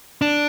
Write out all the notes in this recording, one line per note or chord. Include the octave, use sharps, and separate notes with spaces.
D4